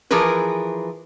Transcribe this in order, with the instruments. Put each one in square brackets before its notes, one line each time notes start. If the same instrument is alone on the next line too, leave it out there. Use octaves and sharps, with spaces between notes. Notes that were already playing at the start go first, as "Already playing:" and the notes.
[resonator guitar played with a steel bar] E3 F3 G#4 A#4 B4